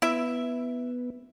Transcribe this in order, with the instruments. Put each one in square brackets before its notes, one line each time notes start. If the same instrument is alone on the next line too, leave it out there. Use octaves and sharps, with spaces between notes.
[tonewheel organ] B3 [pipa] E4 E5